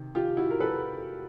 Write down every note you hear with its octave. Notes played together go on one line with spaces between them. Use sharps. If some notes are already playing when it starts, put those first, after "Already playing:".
Already playing: C3 D#3
F4 G4
E4 F#4
A#4
A4 B4